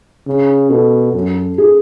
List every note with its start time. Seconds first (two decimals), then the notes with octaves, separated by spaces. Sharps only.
0.27 C#3
0.70 B2 A4
1.14 F#2
1.58 G#4